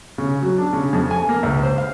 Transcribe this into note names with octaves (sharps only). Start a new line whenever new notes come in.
C#3
F#3
D4
C#3
F2
G#5
A#3
C#2
C5
F5